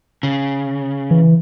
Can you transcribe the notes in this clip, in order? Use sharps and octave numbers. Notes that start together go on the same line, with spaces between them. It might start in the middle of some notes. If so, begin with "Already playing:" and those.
C#3
E3